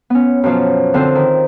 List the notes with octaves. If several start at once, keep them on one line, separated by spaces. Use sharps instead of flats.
B3 C#4
F#2 B2 F3 F#3 F4
D3 C4 F4 A4 C5
D#3